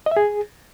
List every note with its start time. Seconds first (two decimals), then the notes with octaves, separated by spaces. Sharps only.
0.06 D#5
0.11 E5
0.17 G#4